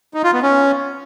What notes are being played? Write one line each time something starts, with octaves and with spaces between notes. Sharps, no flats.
D#4
F4
B3
C#4